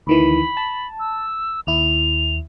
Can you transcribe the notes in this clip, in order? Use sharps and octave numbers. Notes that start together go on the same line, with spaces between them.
D2 D#3 E3 B5
A5
E6
D#2 E4 F7